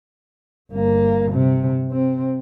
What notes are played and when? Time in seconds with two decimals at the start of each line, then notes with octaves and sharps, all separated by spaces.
0.72 G1 A#3
1.32 C3
1.91 C3 C4